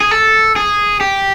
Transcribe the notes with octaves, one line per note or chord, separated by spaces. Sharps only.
G#4
A4
G#4
G4